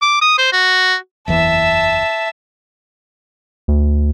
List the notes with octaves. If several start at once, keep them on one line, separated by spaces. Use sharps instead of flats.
D6
D#6
C5
F#4
F#1 E2 E3 E5 A5
D2